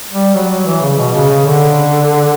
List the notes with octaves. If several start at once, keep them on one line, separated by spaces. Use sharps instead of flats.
G3
F#3
F#3
E3
C#3
B2
C#3
C#3
D3